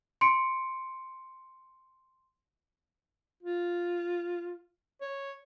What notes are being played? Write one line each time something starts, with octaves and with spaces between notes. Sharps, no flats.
C6 C#7 D7
F4
C#5